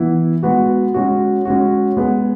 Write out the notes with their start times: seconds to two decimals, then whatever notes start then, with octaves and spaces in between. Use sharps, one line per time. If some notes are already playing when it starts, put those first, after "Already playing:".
Already playing: E3 B3 E4
0.43 G#3 B3 F#4
0.94 G#3 C#4 F#4
1.45 G#3 C#4 F#4
1.97 G#3 B3 G#4